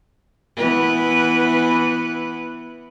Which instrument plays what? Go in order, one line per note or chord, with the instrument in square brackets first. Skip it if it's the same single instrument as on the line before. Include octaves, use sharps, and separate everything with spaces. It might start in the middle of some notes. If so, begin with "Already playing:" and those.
[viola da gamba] E3 B3 B4